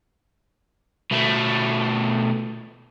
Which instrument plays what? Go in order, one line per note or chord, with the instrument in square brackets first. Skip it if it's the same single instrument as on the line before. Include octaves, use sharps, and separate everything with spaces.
[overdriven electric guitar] B2 A3